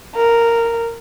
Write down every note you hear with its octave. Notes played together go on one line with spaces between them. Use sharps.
A#4